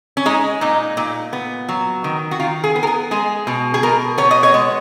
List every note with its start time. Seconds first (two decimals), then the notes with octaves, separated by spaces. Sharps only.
0.17 C#4
0.26 G#3 D#4
0.61 A#2 D#4
0.97 A#2
1.33 B3
1.68 F#3
2.04 D#3
2.31 F#4
2.40 D#3 F4
2.64 G#4
2.76 B3
2.83 A#4
2.87 G#4
3.11 G#3 G#4
3.47 B2
3.74 G#4
3.83 B2 A#4
4.18 B3 C#5
4.31 D#5
4.43 C#5
4.54 G#3